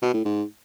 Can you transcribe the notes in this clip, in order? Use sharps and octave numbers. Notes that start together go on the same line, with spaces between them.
B2
A2
G#2